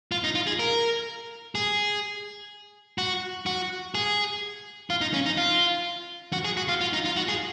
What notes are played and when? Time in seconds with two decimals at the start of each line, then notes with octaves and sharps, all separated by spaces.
0.12 F4
0.24 D#4
0.35 F4
0.47 G#4
0.59 A#4
1.55 G#4
2.98 F#4
3.46 F#4
3.95 G#4
4.90 F4
5.01 D#4
5.14 C#4
5.26 D#4
5.37 F4
6.33 F#4
6.45 G#4
6.57 F#4
6.68 F4
6.81 F4
6.93 D#4
7.05 F4
7.16 F#4
7.28 G#4